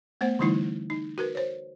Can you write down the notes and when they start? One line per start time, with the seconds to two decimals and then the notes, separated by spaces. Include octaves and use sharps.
0.21 A3 B3 C5 F#5
0.39 D3 E3 G3 A3 D#4 E4
0.90 D#4
1.18 F#4 A#4 B4
1.35 C5 C#5